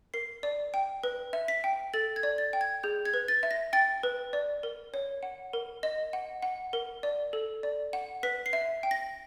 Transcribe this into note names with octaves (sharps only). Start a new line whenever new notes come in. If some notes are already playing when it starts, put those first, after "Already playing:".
A#4 C7
D5
G5
B4
E5
B6
G5
A4 A6
G#6
D5
A6
G5
G#6
G#4 G6
G#6
B4
A6
E5
A#6
G5 A6
B4
D5
A#4
C#5
F#5
A#4
D#5
F#5
F#5
A#4
D5
A4
D5
F#5
B4 B6
C7
E5
G5
A#6